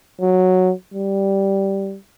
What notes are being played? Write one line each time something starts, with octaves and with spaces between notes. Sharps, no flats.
F#3
G3